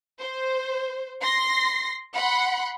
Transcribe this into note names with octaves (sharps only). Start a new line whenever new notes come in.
C5
C6 A#6 C7
F#5 B5 C6